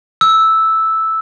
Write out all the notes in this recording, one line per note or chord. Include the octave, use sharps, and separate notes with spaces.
E6